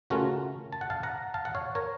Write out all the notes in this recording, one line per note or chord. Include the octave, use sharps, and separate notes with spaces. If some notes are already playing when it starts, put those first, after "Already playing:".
C#3 A3 C#4 F4 F#4 A#4
A5
F#5
F5 A5
F#5 A#5
F5 A5
F#5
C#5 F5
A#4 C#5